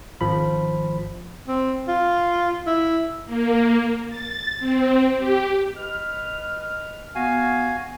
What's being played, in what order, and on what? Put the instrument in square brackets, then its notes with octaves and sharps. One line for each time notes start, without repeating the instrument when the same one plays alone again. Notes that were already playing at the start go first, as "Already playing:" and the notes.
[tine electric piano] G#1 F3 B5
[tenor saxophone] C4
F4
E4
[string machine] A#3
A6
C4
G4
[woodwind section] B4 D#5 F6
[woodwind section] B3 [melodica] F#4 F5 G#5